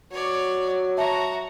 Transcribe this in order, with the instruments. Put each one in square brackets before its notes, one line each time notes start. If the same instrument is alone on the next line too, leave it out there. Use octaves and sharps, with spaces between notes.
[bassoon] F#3 [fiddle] C#5 D5
[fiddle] F#4 A#5 [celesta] E5 A5